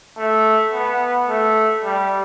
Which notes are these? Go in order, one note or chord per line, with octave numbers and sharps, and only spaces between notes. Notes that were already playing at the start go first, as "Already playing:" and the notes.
A3
B3
A3
G3